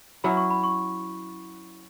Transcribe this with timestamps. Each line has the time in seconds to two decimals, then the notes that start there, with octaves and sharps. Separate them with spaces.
0.24 F#3 C#4 E4 B5
0.37 C#6
0.51 B5
0.64 C#6